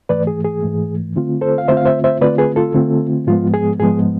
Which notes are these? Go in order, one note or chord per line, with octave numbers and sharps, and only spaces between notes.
G#2 E3 A3 B4 D5
G#4
G#4
G#2 E3 A3
D3 A3 C4 F4
A4 C5
F5
D3 A3 C4 F4 C5 E5
F5
C5 E5
C5 E5
D3 A3 C4 F4 B4 D5
G#4 B4
F4 A4
D3 A3 C4 F4
G#2 F3 G#3 B3 F4
G#4
G#2 F3 G#3 B3 G#4